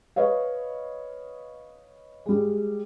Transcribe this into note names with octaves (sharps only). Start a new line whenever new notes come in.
B4 C#5 D#5 F5
G3 G#3